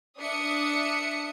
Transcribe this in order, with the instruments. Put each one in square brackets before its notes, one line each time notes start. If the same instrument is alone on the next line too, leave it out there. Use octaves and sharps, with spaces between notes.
[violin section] D4 E5 D#6 C#7